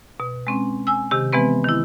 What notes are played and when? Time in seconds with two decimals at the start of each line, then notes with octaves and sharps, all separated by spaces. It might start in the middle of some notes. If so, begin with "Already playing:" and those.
0.20 B2
0.47 G#3 C4 C#4
0.87 G#5 E6
1.11 C3 D#3 G4
1.33 E3 G#3 B3 C4 B4
1.64 D#3 E4